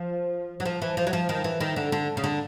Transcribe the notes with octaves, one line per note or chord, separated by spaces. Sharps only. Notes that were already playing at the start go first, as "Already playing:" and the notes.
Already playing: F3
F#3
F3
E3
F3
F#3
F3
D#3
E3
D#3
D3
D3
C#3
D3